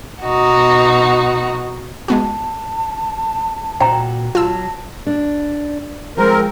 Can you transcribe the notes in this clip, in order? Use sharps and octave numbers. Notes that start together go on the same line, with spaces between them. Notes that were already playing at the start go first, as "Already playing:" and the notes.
B2 D#4 F#4
G#3 B3 F#4 A5
A#2 F#4 C5 G5 A#5
F#3 F4 A5 E6
D4
F3 G#3 C4 A#4